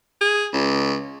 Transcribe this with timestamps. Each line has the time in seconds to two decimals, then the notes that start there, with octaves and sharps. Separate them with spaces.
0.21 G#4
0.54 C#2